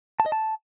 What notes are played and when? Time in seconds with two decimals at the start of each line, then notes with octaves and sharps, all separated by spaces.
0.20 A5
0.26 D#5
0.32 A5